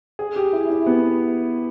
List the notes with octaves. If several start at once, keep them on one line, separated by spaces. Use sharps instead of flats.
G#4
G4
E4
E4
B3